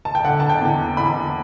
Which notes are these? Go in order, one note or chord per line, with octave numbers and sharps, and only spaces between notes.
A5
G5
D3 F#5
A5
G5
E2
E2 B5